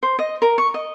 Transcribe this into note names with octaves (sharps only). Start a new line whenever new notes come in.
C5
D#5
A#4
C#6
D#5